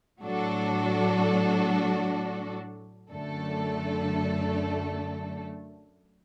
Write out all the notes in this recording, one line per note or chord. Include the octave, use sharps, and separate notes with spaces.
A2 F#3 D4 F#4 A4
F#2 D3 A3 D4 A4